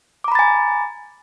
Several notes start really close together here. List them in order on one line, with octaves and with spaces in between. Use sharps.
D6 A#5 B5 A6 G#5